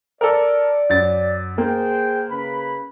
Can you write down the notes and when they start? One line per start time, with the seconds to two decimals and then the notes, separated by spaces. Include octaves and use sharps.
0.21 A4 A#4 D5
0.90 F#2 A6
1.58 A#3 G#4 C5 G5
2.30 C#3 B4 B5